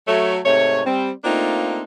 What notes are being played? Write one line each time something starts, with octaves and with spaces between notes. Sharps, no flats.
F#3 A3 C#5
G#2 C3 A3 C#5
G3 C4
A3 A#3 C4 D4 D#4 F4